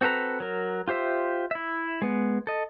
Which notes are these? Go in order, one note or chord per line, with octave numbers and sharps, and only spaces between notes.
C4 F#4 A4 B4 A#5
F#3 A#4
F4 G4 C5 E5
E4 E5
G#3 B3
A4 D#5